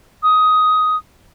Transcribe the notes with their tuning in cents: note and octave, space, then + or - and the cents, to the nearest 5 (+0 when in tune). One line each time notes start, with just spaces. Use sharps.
D#6 +10